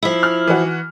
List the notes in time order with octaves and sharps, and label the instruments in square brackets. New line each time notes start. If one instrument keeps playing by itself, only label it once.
[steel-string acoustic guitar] F3 E4
[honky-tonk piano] F6
E3 F#4